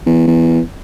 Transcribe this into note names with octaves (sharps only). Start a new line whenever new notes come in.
E2
E2